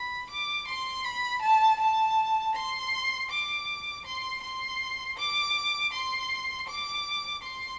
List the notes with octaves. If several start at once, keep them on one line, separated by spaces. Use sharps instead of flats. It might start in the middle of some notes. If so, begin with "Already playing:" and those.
Already playing: B5
D6
C6
B5
A5
A5
C6
D6
C6
C6
D6
C6
D6
C6